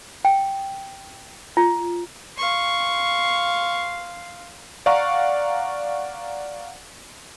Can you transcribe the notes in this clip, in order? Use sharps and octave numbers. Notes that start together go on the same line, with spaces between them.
G5
F4
F5 C6 C#6
D5 F5 F#5 A#5 C#6